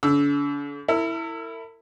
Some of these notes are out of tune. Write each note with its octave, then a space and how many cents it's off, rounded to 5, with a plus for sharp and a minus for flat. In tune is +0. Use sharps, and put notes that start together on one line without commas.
D3 -40 E6 +0
E4 +0 A#4 -45